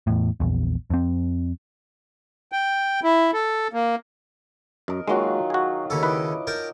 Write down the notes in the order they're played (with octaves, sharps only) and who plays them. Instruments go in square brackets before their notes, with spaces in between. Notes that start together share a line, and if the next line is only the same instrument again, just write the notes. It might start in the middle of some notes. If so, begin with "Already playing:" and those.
[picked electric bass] E2 A2
A#1 E2
F2 C4
[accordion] G5
E4
A4
A#3
[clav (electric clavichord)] F#2 [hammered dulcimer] A#4 D#5
[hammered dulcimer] D#3 F#3 F4 [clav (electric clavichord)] G#3 A#3 F#4
[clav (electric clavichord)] F#4 G#4
[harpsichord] D#2 C#3 A4
[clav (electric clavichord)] E4 B4 E5 [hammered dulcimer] D#5 D6
[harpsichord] A#4 G5 A5